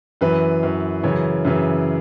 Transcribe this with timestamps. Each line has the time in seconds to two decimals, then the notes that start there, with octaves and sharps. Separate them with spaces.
0.21 F#2 E3 B4
0.63 F#2 E3
1.03 F#2 C#3 E3 C#5
1.45 F#2 C#3 E3